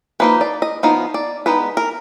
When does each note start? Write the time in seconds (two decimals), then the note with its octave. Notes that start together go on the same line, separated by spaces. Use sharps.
0.20 F3 A#3 D#4 B4
0.41 D5
0.62 D#5
0.83 F3 B3 D#4 F5
1.14 D5
1.46 G#3 B3 D#4 B4
1.77 A#4